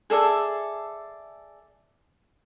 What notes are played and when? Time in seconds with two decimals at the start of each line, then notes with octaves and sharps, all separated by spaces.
0.10 G#4 A4 D5 E5